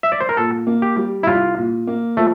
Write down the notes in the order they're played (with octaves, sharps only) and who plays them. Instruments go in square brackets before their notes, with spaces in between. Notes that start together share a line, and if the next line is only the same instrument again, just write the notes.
[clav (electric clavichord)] E5
D5
C5
A#4
[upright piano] A#2 [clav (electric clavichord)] A4
[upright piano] A#3
[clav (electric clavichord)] G4
[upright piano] G3
[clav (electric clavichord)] E4
[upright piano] C2 [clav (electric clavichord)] F4
[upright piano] A#2
A#3
[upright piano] F3 [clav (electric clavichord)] A3